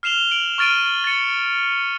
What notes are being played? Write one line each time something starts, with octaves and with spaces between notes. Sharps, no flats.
F6 C7 E7 F7 G7
D7 F#7
C#6 F6 A6 D7 D#7
A6 C#7